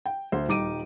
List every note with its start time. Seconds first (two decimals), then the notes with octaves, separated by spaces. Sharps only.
0.06 G5
0.32 D2 C5
0.48 D#1 G3 D#4 D6 D7 D#7